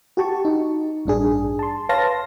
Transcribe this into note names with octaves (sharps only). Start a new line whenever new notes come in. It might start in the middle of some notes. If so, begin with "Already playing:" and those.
F#4 G4 A5 C#6
D#4
A1 G2 D4 G#4
A5 C6
B4 C#5 F5 A5 C6 A#6